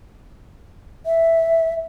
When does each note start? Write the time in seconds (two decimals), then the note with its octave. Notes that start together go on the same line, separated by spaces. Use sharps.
1.06 E5